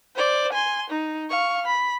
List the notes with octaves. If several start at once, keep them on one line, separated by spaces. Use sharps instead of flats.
C5 D5
G#5 C6
D#4
F5 C#6
B5